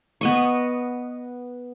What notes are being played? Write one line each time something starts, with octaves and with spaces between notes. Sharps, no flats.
B3 D#5 C#6